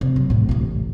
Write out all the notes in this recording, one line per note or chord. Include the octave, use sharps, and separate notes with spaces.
C3
F#3
A2 C3
A1 D2